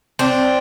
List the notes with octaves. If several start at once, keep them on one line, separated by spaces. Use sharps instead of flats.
C4 D4